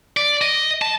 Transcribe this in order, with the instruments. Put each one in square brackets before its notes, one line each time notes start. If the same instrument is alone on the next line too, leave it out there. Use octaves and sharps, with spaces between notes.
[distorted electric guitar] D5
D#5
A5